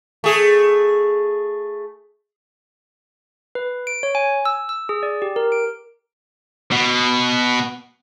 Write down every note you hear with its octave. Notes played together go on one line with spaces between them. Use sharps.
A3 G#4
B4
D7
C#5
G#5
E6
E6
G#4
D5
G4
A#4
D7
B2